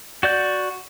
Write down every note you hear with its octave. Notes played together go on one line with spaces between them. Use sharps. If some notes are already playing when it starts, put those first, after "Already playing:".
F#4 D5 G6